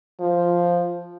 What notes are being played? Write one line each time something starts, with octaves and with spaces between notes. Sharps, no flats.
F3